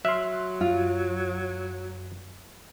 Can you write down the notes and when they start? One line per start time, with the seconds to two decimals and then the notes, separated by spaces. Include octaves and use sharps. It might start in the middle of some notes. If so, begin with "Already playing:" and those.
0.05 F#3 E5 C6 F6 F#6
0.61 F#2 F4